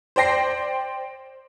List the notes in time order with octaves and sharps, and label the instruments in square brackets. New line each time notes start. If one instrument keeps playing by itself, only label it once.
[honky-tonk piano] C5 D5 G5 A#6 C7